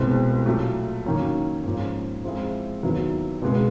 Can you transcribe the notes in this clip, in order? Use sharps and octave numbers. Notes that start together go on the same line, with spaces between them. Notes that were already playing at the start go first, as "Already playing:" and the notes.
Already playing: C2 B2 G#3 C4 E4
A#2 F#3 A3
D#3 F#3 A#3 C#4
G#2 F3 A#3 C#4
F3 G#3 C4 E4 G#4
D#2 D#3 F#3 B3 E4
C#2 B2 G#3 B3